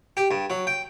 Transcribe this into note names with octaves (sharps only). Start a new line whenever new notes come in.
G4
G2
F#3
G5